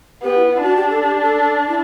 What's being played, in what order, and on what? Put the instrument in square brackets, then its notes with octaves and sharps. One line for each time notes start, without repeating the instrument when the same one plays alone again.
[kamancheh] B3 [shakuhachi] G4
[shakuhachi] E4
E4
[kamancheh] D4 [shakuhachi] F#4
[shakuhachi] G4
A4
G4
A4
A4
E4